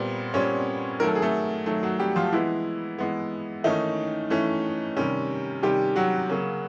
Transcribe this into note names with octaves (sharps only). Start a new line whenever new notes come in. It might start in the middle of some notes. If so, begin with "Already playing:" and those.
Already playing: A#2 G3 B3 C4
A#2 G3 C4 C#4 C#5
D#3 F#3 A3 A#4
A4
G#4
A3 A4
D#3 F#3 A3
F#3 F#4
G3 G4
F3 F4
E3 G#3 B3 E4
E3 G#3 B3
D#3 E3 A3 C#4 D#4
E3 A3 C#4
C3 D#3 G3 C#4
C3 D#3 G3 G4
F#3 F#4
C#3 F#3 A#3 C#4